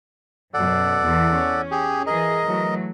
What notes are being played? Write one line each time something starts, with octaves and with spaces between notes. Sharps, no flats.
F#2 B2 A4 D5 F#5
E2 E3
C#4
G4 G#4
E3 G#4 A#4 D#5
E3 F#3 A3